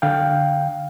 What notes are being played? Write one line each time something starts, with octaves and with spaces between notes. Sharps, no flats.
D3 F5 G5